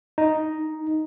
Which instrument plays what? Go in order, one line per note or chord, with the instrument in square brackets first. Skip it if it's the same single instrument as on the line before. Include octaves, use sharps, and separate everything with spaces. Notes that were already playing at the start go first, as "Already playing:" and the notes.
[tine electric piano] D#4